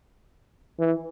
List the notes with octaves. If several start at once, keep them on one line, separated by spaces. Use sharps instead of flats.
E3